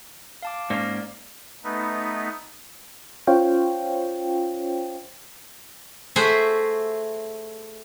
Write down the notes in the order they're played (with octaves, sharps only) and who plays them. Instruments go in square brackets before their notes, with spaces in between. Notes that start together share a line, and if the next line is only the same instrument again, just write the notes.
[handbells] F5 A5 D6
[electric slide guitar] G#2 A#3 C#4 [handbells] D5
[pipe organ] A3 B3 D#4 B4
[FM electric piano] C#4 F4 C5 C#5 F5 G5
[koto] A3 F#4 G#4 C5 E5